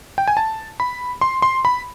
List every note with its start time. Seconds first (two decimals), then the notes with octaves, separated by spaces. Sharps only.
0.18 G5
0.28 G#5
0.37 A5
0.80 B5
1.21 C6
1.42 C6
1.65 B5